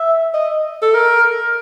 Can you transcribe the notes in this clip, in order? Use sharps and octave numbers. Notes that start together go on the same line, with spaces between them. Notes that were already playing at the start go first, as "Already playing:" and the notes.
Already playing: E5
D#5
A4
A#4